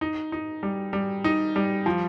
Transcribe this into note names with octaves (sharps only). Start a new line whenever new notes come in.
D#4
D#4
G3
G3
D#4
G3
F3